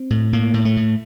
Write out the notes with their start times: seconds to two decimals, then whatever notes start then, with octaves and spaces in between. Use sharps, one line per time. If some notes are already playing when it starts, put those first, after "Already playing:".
Already playing: C4
0.10 A2
0.33 A2 A#3
0.54 A2
0.65 A3
0.77 A2